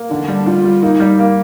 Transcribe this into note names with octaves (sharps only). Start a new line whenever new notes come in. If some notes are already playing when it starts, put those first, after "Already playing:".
Already playing: A#3
D3 D4
G3
G3 F4
G3
A#3 D#4
G3
A#3